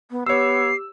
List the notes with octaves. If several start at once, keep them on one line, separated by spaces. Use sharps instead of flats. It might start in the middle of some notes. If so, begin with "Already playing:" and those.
B3
B3 G4 C#5 D6 E6 C7